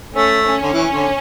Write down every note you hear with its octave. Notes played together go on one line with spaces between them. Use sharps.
A3 C#4
C#4
D3
E3
D3